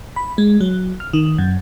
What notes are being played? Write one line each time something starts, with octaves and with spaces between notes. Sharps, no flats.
B5
G#3
F#3
F6
D#3
F#2